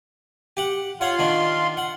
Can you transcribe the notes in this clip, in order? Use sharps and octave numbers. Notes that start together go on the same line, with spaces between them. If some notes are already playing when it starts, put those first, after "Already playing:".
G4 F#5
F4 C#5 F5 F#5 C6
D#3 D4
F#5